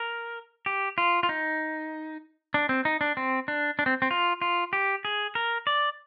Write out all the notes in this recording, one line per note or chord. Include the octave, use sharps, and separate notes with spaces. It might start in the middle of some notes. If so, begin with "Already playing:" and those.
Already playing: A#4
G4
F4
F4
D#4
D4
C4
D#4
D4
C4
D4
D4
C4
C4
F4
F4
G4
G#4
A#4
D5